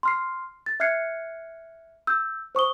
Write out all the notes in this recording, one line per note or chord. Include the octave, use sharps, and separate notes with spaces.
C6 F6 C7
A6
E5 F6 F#6 G#6 C7 C#7
E6 G6
C5 C#6 D#6 G7